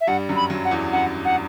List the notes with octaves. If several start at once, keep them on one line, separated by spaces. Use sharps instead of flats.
E5
G2 G3 F#5
F#2 F#3
B5
F#2 F#3
F#5
E2 E3
F#2 F#5
F#5